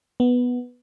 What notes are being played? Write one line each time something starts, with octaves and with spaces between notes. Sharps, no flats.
B3